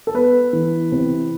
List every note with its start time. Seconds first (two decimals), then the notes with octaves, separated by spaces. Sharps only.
0.07 A4
0.14 B3 B4
0.53 E3
0.92 C3